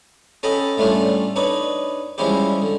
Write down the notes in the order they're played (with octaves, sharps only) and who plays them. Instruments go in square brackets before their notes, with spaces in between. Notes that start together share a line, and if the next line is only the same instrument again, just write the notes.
[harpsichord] C#4 A4 D#5 G5 B5
A2 G3 A3 C#4 D4 F4
D4 D#4 B4 C#5
F3 G3 G#3 C#4 E4 G4
D3